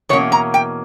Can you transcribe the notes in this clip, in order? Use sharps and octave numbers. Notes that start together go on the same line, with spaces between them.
E2 B2 A#3 C#4 C#5
A#5
G5